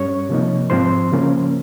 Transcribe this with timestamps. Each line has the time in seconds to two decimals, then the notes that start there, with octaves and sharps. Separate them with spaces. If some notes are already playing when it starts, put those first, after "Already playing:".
Already playing: G2 G3 C#4 C#5 C#6
0.29 C3 F3 A#3 D#4
0.70 G#2 F3 C4 C5 C6
1.12 C#3 F3 A#3 C#4